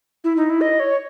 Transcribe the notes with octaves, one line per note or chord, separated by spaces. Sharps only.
E4
D#4
E4
D#5
C#5